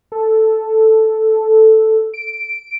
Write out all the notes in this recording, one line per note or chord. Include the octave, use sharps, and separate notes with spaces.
A4
D7